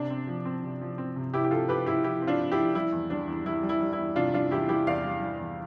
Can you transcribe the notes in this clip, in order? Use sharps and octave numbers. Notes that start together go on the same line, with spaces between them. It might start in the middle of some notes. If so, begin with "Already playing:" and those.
Already playing: C3 D4
C4
F3
C4
C3
F3
C4
C3
C3 E4 G4
G4
C3 F4 A4
C4 G4 B4
C4 E4 G4
F3 E4 G4
C4
D4 F4
C4
E4 G4
F3
G3 E4
E2
G3 D4
E2
G3 E4
G3
E4
G3
E4
E2
C3 D4 F4
G3 D4 F4
E2 E4 G4
G3 E4 G4
E2 D5 F5
G3
G3
E2